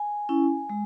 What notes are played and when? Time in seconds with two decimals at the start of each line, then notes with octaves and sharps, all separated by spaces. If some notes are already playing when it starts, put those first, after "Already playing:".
Already playing: G#5
0.29 C#4 E4
0.69 G#3